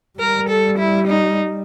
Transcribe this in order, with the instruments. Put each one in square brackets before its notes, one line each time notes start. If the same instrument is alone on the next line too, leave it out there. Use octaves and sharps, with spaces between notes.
[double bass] G3 [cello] A#4
[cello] A4
E4
D#4